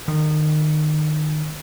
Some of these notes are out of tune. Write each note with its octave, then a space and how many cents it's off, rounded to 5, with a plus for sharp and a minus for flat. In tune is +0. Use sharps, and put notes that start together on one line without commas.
D#3 -30